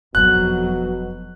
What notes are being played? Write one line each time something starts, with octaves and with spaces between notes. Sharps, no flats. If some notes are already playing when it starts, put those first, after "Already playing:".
F#1 F2 B2 F#3 D4 F#6